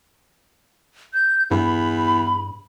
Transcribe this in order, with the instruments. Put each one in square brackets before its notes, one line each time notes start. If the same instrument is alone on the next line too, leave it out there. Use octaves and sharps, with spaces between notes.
[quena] G6
[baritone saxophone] E2 [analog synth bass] G2 [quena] B5